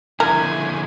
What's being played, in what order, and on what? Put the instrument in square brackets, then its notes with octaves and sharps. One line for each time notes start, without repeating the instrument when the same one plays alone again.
[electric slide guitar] F2 D3 E4 [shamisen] A#4 [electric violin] G#5